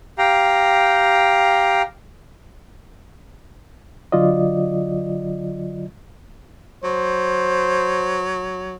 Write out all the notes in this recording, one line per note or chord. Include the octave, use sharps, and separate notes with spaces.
G4 F5 G5 A#5
D3 F#3 F4 D5 D#5
F#3 C5